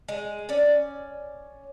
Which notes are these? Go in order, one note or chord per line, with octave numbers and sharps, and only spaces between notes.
G#3
C#4 D5